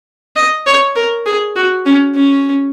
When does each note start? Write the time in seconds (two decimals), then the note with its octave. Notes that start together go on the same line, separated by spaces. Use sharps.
0.36 D#5
0.66 C#5
0.96 A#4
1.26 G#4
1.56 F#4
1.86 C#4
2.15 C#4